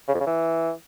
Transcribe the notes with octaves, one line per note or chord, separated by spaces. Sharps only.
C#3
F2
C#3
E3